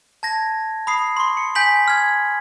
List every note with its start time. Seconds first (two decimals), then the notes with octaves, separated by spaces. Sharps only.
0.23 A5 G#6 A#6
0.87 B5 D#6 C7
1.17 C6 C#6
1.37 C#7
1.55 G#5 G6 B6 F#7
1.88 F6 G#6